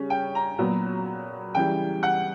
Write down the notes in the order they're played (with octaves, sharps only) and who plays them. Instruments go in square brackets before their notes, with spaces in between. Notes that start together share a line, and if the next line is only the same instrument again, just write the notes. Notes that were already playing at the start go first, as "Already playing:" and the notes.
Already playing: [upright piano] C#3 G3 C#4
G5
A#5
A#2 F#3 B3
C#3 E3 G3 G5
F#5